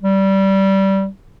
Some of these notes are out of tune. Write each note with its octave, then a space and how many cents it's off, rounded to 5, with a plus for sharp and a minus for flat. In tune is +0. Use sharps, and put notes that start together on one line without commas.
G3 -15